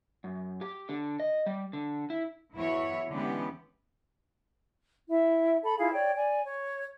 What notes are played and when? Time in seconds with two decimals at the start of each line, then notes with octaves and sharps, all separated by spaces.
0.24 F#2
0.61 G4
0.89 D3
1.20 D#5
1.46 G3
1.73 D3
2.10 E4
2.56 E2 E3 E4 F#4 C#5 E5
3.11 D3 E3 G#3 B3 C#4 G4
5.10 E4 E5
5.64 A4 B5
5.78 E4 F4 G#4 F5
5.93 C#5 D5 G5
6.16 D5 G#5
6.45 C#5